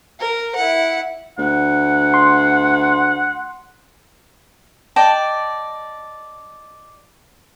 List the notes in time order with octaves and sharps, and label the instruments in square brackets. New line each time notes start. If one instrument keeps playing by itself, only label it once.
[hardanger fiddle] A#4
E4 F#5
[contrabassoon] D2 [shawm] F#5
[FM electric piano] C6
[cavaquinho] D5 D#5 G5 A5